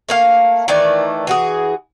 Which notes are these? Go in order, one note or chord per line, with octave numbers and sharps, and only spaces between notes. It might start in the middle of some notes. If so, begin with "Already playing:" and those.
A3 A#3 F5
D#3 E3 A3 D5
E3 F#4 G#4